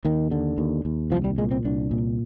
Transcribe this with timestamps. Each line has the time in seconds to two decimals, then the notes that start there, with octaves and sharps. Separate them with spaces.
0.05 D#2 D#3
0.31 D3
0.58 D#2
0.85 D#2
1.11 C2 F3
1.24 G3
1.38 A#2 G#3
1.51 C4
1.65 C2 D4
1.91 A#2